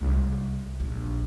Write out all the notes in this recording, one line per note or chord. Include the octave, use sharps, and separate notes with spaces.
C2
A#1 D#2